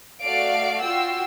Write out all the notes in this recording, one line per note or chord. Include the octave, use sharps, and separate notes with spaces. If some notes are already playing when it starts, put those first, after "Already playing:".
A3 F#4 D5 F5 C7 D7
F4 F#4 G5 E6 C7